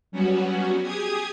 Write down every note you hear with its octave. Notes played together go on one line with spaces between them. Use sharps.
F#3 G3 B3 C#4 F#4
G4 G#4 D#6 G#6